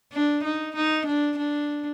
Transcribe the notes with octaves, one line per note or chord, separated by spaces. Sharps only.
D4
D#4
D#4
D4
D4